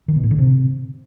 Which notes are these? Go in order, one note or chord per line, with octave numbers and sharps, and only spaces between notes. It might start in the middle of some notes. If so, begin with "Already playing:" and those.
D#3
B2
A2
D3
C3